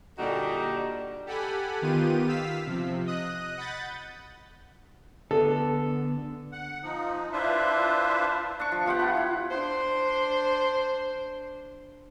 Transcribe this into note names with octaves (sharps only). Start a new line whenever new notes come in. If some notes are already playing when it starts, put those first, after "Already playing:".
A#2 D3 G3 D4 D#4 F#4
G4 A4 F#5 G#5 B5
D#3 B3 F4 G4 D#7
F5 E6 B6
C3 F3
D#5 D#6 F#6
F#5 B5 G6 A6
D3 B3 A4
F#5
F3 D#4
D4 E4 F4 B4 C5 E5
D4 C#6
F3
B3 F4 G4 F#5
B4 F#5
E4 F4
D4 C5